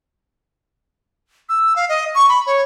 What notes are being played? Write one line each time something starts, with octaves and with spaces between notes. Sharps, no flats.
E6
F5
D#5
C#6
B5
C#5